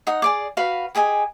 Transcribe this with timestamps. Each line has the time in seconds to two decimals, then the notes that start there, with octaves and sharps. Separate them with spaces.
0.07 D#4 F#5 D#6
0.22 G#4 D5 D6
0.57 F#4 B4 F5 B5
0.95 G4 G#4 D#5 G#5